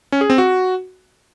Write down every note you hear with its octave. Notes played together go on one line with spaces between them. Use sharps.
C#4
G#4
C4
F#4